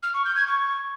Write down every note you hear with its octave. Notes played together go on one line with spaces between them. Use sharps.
F6
C#6
G6
G#6
C#6